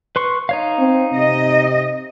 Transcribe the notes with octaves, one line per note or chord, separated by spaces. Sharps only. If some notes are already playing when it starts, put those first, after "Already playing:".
B4 C6 C#6
D#4 C#5 F5
C4
C3 D#5